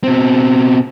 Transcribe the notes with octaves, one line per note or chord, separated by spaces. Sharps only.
B2 C4